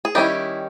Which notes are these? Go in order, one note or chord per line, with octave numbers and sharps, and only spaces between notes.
G#4
D#3 G3 C#4 E4 G4